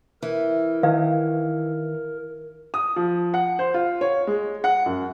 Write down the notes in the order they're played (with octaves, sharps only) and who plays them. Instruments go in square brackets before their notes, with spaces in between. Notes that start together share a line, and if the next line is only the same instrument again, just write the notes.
[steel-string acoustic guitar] E3 [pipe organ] A#4
[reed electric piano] D#3 [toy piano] D#4 B4 F5
[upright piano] D#6
F3
F#5
C5
F4
C#5
G#3
F#5
F#2